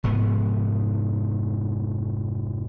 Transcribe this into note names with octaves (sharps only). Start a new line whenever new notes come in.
F1 G#2 B3